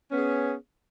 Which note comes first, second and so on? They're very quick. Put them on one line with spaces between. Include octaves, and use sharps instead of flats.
C#4 B3 G#4